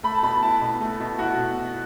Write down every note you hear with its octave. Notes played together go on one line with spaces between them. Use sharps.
A3 B5
A5
B2 B5
E4 A5
B2
A3
B2
E4 F#4
B2